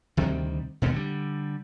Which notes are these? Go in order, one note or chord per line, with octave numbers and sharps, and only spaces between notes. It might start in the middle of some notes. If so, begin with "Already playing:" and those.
D2 C3 D#3 G3
D#2 B2 D3 G#3
D3 G3